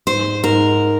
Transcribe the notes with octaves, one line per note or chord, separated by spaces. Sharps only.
G#2 C5
G#2 A#4